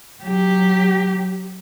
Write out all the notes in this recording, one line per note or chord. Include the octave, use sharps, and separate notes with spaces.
F#3 G4